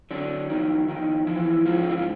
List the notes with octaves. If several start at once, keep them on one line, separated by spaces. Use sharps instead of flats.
D3 F#3 D4
F2 D#3 D#4
F2 D#3 D#4
E3 F3 E4
G#2 F3 F4
D#4
E4
F4